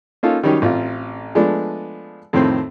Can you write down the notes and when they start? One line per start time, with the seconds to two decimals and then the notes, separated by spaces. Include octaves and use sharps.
0.23 A#3 C#4 D#4 F4 A4
0.43 D#3 F#3 G3 C#4 D#4 G4
0.62 A1 C4 F4
1.35 F3 G#3 A3 B3 D4
2.33 F2 A2 D#3 C4 C5